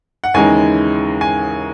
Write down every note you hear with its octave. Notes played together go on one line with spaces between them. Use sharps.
F#5
D#2 C#3 E3 G#3 D#4 G#5
G#5